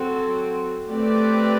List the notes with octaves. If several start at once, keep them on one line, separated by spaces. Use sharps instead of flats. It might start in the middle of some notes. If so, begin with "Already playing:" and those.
Already playing: F#3 C4 F#4 A4
A3 C4 G4 B4 D5